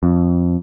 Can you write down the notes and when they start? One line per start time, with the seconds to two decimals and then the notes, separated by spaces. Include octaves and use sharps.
0.03 F2